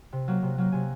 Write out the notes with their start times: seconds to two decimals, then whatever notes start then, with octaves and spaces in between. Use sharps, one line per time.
0.12 C3
0.28 F#3 A#3
0.43 C3
0.58 F#3 A#3
0.72 C3 G#5